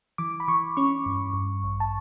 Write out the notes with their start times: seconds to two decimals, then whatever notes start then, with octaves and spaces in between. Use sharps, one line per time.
0.18 E3 D6
0.40 B5
0.48 E3 C#6
0.77 C#4 C#6
1.06 G2
1.34 G2
1.63 A1
1.80 A5